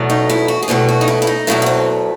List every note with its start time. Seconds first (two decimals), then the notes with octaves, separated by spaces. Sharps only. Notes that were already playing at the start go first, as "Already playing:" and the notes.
Already playing: E2 B2 F#3 A3
0.10 D#4
0.29 E4
0.48 F#4
0.63 G#4
0.68 E2 B2 F#3 A3 G4
0.89 F#4
1.01 D#4
1.08 E4
1.22 E4
1.27 D#4
1.47 E2 B2 F#3 A3 E4
1.62 C#4
1.66 C4